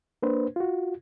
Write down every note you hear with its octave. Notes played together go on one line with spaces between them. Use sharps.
A#3 D4 B4 C5
F4 F#4